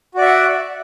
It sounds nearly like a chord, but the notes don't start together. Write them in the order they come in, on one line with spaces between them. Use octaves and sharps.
F#4 D5 E5 F#5